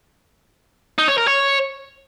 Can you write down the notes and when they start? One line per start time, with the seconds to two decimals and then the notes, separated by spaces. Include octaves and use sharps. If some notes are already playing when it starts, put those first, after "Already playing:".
0.98 D#4
1.08 C#5
1.18 A#4
1.27 C#5